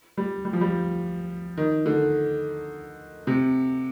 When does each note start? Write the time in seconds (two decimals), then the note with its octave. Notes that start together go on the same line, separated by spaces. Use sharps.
0.17 G3
0.45 G3
0.53 F3
0.61 G3
1.57 D#3
1.86 D3
3.27 C3